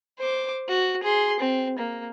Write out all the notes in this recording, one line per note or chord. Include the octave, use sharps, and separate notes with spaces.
C5 D6
F#4
G#4 C6
C4
A#3